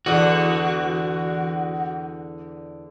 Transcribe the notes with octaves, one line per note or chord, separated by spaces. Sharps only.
E2 D3 F#4